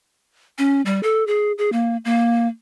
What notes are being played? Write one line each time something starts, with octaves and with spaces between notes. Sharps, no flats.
C#4
G3
A4
G#4
G#4
A#3
A#3